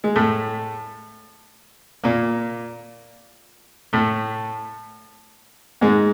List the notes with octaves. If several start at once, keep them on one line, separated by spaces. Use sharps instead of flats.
G#3
A2 A3
A#2 A#3
A2 A3
G#2 G#3